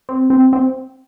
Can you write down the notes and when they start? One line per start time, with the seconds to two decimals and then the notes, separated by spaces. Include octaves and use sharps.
0.09 C4
0.30 C4
0.53 C4